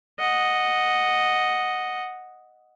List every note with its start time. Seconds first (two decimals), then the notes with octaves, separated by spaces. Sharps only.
0.19 D#5 F#5